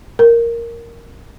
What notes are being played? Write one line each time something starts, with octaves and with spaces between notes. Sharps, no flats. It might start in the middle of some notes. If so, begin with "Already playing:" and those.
A#4